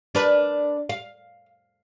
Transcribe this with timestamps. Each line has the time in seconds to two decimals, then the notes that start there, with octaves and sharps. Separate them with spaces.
0.15 D4 A#4 B4
0.89 F5